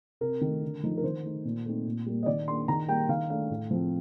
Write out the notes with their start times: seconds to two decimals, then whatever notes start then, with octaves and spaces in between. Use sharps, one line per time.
0.21 C3 A#4
0.41 D#3
0.46 A3
0.62 D3
0.83 F3 A3 D#4
0.97 A#4
1.04 D#3 C5
1.23 A3 D#4
1.45 A#2
1.66 A3 C4 D#4
1.86 A#2
2.06 G3 A#3
2.23 D#5
2.26 D#3 D5
2.48 A#3 D4 C6
2.68 D#3 A#5
2.88 G3 A#3 G5
3.09 D#3 F5
3.30 A3 D4 F5
3.50 A2
3.71 F3 C4